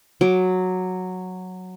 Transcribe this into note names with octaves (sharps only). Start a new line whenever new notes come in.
F#3 D6